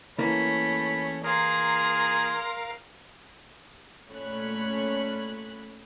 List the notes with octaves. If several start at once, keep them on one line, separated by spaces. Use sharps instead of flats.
E3 A3 A#3 C#4 B5
G#4 A#4 F5 A#5 C6
A#2 A3 C#4 C#5 B5 F#6